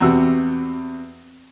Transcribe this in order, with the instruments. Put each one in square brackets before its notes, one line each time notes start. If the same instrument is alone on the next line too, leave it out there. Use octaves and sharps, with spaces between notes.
[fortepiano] E2 C3 F#4 E6